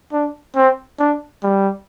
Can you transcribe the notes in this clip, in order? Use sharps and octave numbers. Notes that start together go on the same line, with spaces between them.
D4
C4
D4
G3